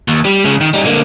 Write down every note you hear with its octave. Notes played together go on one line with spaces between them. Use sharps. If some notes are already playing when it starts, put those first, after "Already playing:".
D#2
G3
C#3 G#3
D#3
G3 D#4
D3 A#3